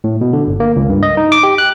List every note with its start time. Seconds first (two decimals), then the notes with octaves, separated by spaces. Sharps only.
0.04 A2
0.21 B2
0.33 D3
0.47 G1
0.60 A#3
0.76 C#2
0.89 G2
1.03 D#5
1.17 D#4
1.32 D6
1.43 G4
1.58 F#6